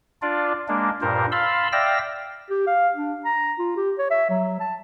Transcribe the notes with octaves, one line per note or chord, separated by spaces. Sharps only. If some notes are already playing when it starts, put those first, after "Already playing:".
D4 F4 D5
G#3 A#3 D4
G2 A#2 A#4 C5
F5 A5 B5 C6 E6
D5 E5 F5 G5 E6 A#6
G4
F5
D4
A#5
F4
G4
C#5
E5
F#3
A5